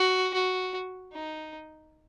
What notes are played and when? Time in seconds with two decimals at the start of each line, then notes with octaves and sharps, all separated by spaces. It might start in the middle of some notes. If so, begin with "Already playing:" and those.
Already playing: F#4
0.34 F#4
1.13 D#4